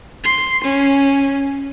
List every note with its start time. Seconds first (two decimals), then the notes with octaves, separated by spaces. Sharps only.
0.24 C6
0.64 C#4